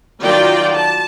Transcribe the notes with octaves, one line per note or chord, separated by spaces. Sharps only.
D#3 F#3 F4 F#4 D5 G5
A5